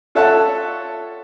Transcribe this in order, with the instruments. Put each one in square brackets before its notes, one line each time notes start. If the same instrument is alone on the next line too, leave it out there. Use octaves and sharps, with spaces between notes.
[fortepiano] F4 A4 C#5 E5 F#5 A5